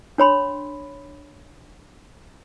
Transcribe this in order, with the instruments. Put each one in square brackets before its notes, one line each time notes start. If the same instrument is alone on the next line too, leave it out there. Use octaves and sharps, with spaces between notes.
[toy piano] D4 C#5 B5 C6